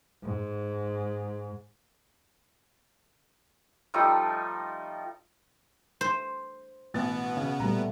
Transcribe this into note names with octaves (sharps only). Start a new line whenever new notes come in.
G#2
F3 G3 A3 D#4
C5
A1 B2 B3 A6
C#3
A#2 G3 A3 A#5